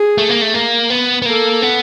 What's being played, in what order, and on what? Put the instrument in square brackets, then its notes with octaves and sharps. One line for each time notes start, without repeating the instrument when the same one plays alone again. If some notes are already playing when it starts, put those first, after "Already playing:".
Already playing: [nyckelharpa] G#4
[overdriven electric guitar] A3
A#3
A3
A#3
B3
B3
[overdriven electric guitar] A#3 [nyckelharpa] A4
[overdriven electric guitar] B3